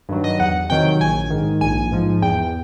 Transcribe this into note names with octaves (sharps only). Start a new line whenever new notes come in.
G2 D#3 F#3
D#5
E2 F#5
C3 D#3 F#3 G5
A#1 G#5
G#2 D#3
A#1 G#5
G#2 F3
E2 G5